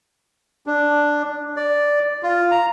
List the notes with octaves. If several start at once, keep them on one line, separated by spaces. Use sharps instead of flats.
D4
D5
F4
A#5